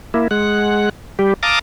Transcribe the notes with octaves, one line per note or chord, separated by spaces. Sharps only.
A#3 E4
G#3 F#5
G3 G4
F5 A5 A#5 D6 D#6